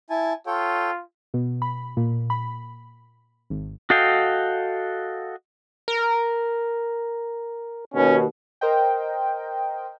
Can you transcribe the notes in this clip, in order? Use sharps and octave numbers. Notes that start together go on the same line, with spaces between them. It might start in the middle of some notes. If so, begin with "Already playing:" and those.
E4 G#5 A5
F4 A4 C#5 G5
B2
B5
A#2
B5
G#1
F#4 A4 D#5 F5 G5
A#4
D#2 B2 C#4
A#4 C5 D#5 G5